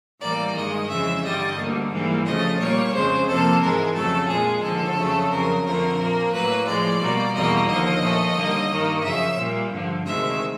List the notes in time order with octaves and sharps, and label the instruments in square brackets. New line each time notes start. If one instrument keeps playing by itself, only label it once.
[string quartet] A2 E3 G3 A#3 D5
G2 D#3 G#3 D#5
F2 C#3 E3 G#3 E5
G2 D3 G3 D#5
D2 D3 G3 A#3
G#2 E3 G3 A#3
D2 C#3 F3 A3 D#5
A#2 G3 A#3 C#5
F2 C#3 F3 G#3 C5
F2 C3 F3 A#3 A4
G#2 E3 G#3 A#4
F2 C#3 F#3 A3 A4
A#2 F3 G#3 G#4
D#2 D3 F3 A4
F2 C#3 F#3 A3
F2 C#3 F#3 A#4
F2 D3 F3 A3 A#4
A#2 F3 A#3
A2 F#3 A#3 B4
A2 F3 G#3 D5
B2 G3 A#3
E2 B2 G3 A#3 D#5
D#2 D3 F3 D#5
A#2 F3 A3
D#2 D3 G3 A#3
G2 D#3 G3 A#3
F#2 C#3 F3 E5
A#2 G3 A#3
G2 D3 F3
D2 C3 D#3 G#3 E5